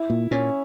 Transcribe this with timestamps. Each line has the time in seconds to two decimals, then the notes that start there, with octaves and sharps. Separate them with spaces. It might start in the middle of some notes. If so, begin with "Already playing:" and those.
Already playing: E4
0.10 A#2
0.31 A#2 C#4